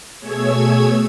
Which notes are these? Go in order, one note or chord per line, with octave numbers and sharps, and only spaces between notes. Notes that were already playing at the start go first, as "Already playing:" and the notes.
B2 A3 G#4 C#5 E6 G#6